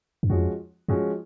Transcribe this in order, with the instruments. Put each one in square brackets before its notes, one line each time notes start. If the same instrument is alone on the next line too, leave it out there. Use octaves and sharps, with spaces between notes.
[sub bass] F#2
[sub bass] F2 [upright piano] F3 G#3 C#4 F#4
[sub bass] F#2 [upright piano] F3 G#3 C#4 F#4